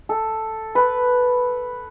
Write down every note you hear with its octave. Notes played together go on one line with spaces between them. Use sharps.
A4
B4